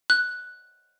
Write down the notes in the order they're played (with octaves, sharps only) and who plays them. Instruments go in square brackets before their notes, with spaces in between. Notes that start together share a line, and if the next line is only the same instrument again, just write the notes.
[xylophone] F#6